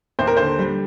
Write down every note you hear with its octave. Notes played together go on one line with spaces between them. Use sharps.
D#2 C5
A#4
D3 C5
G3